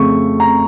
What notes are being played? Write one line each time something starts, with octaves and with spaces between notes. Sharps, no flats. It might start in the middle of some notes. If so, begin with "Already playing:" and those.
Already playing: F2 C#3 A3 C#6
A#5